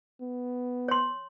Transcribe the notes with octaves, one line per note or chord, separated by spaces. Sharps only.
B3
C#5 C6